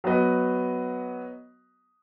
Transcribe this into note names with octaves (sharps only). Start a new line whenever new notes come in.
F#3 B3 F#4 B4 D#5